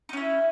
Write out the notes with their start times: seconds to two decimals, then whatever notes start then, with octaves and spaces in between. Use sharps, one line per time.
0.09 D#4
0.13 C#4
0.17 E4